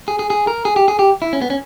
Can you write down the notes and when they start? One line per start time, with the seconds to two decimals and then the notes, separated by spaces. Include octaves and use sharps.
0.08 G#4
0.19 G#4
0.30 G#4
0.47 A#4
0.65 G#4
0.76 G4
0.88 G#4
0.99 G4
1.22 E4
1.33 C#4
1.42 B3
1.50 C#4